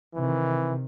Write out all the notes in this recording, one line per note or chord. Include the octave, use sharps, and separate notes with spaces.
C3 D#3 E3